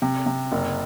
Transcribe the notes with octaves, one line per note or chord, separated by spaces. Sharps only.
C3
C3
F#1